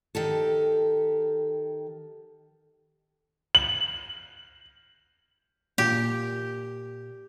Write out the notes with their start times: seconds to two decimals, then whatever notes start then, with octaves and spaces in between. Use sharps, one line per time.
0.15 D#3 G4 A4
3.55 F#7
5.78 A#2 G4